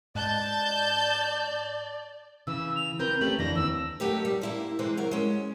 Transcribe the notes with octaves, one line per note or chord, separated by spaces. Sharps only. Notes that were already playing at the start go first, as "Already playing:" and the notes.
G#2 D5 D#5 A5 F#6 G6
C#3 E3 E6
F7
C4 A#4 B4 G6
A3 C#4 G4 F#7
F2 E3 D4 A#6
D#2 C4 E6
F#3 A3 D#4 G4 A#4 B4
G3
A#3 E4 C5
C3 E3 G#3 B4 C5
F#3 A#4
G#3 C#4